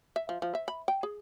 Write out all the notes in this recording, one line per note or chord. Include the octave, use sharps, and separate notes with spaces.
E5
F3
F3
E5
B5
G5
G#4